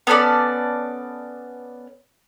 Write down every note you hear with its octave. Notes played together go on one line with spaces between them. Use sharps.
B3 C#4 A4 D5